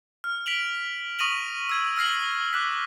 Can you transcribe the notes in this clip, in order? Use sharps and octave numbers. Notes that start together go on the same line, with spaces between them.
F6
B6 D7 F7 F#7
C#6 D#6 A#6 D#7 F7 F#7
E6 G#6 D#7
E6 F6 A#6 C7 F#7
D6 F#6 B6